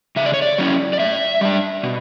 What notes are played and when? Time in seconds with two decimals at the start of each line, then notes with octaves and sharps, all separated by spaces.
0.16 C#3 E5
0.26 D5
0.34 C#5
0.42 D5
0.58 F#3 C#4 E4
0.93 D5
1.00 A2 E5
1.41 G3 D4
1.83 B2